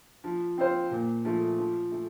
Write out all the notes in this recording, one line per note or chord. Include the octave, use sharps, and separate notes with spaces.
F3
C4 F4 C5
A#2
F3 A3
F3
A3